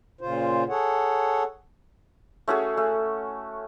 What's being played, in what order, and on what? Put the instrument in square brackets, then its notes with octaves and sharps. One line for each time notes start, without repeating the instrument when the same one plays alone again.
[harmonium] A#2 C#3 F4 C5
G#4 A4 C#5 F#5
[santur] A3 C#4 F#4 G#4
A3